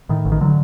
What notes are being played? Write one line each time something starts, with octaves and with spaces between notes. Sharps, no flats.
A2 D#3
A1
D#3
D3 F#3